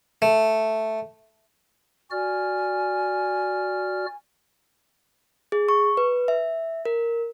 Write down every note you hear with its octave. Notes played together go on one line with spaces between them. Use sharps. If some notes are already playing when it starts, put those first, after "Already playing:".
A3
F#4 D5 G#5 F6
G#4
C#6
B4
E5
A#4